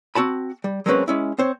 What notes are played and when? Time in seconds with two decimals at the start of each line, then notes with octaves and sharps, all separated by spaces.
0.15 C4 F#4 A5 B5
0.64 G3
0.86 F#3 G#3 A#3 C4 C#4 B4
1.08 G#3 C#4 E4
1.38 C4 C5 C#5